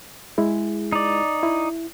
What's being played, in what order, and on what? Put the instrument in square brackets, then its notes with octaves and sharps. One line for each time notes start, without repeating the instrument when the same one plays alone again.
[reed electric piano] G#3 E4 G#4
[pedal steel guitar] D#4 D5
[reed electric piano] E4